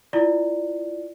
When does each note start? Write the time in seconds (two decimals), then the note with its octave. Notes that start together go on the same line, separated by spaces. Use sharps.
0.13 E4 F4 D5